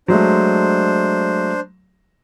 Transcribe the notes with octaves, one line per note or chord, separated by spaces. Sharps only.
F#3 G#3 A3 D4 C5